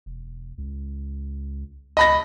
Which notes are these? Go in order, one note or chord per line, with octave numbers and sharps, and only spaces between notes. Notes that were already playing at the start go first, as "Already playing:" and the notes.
E1
C#2
C#2 D#5 B5 A#6